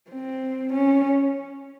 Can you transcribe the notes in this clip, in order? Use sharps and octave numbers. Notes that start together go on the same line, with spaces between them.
C4
C#4